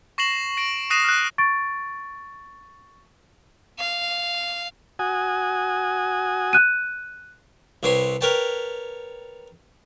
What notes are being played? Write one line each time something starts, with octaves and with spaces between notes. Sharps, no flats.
C#6 A#6 C7 E7 F#7
A#6 D7
D#6 F#6 A#6 C7 D#7 E7
F6 F#6
C#6 A6 D7
F5
F#4 G#5 D#6
F#6 D#7
C2 C3 B4 C#5 C6
A#4 B4 C#5 G5 A5